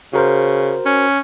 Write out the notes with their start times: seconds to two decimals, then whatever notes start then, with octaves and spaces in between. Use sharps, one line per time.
0.13 C#3 F#4 A#4 C5
0.86 C#4